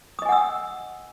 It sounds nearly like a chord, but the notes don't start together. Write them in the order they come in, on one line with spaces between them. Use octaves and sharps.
D#6 D#5 G#5 F#5 E6